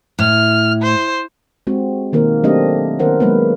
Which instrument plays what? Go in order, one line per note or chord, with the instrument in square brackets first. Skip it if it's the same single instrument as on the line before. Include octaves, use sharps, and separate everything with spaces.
[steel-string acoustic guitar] A2 [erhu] F6
[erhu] C5
[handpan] G#3 C4 F#4
B2 D#3 A#3 A#4 C5
F#3 A3 C4 D4 G4 D#5
D#3 B3 C#4 A#4 C5 F#5
F#3 G#3 A#3 B3 B4